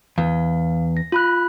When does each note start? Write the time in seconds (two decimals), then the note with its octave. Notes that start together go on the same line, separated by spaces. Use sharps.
0.18 E2 F5
0.97 A#6
1.12 F4 B5 F#6